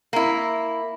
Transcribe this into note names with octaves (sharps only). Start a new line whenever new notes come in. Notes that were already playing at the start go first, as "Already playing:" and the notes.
A#3 E4